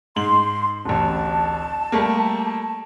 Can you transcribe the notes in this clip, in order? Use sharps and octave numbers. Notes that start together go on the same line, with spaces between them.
G#2 C6 F#7
D1 A1 A5
G3 A3 A#3